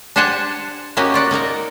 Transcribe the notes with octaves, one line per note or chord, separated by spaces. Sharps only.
D4 G4 C5 F#5 G#5 A5
A#3 C#4 F#4 G4 D#5
F4 D5 F#5
A#3 D#4 A#4 A#5